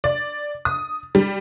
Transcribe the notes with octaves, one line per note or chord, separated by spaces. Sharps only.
D5
D#6
G3